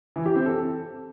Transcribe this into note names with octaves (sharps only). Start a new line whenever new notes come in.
E3
G4
C4
A4